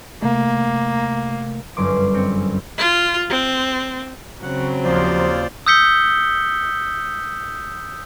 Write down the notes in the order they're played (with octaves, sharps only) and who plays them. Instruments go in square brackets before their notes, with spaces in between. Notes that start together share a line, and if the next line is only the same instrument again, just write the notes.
[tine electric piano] C3 A3 [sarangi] A#3
[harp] G1 F#2 C6 D6
C4 C#7
[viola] F4
C4
[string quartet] C#3 F#3 C4 [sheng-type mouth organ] F#5
[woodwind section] D#2 [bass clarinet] F3 [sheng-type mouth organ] F4 C5 D5
[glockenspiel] D#6 E6 G6 B6 C#7 G7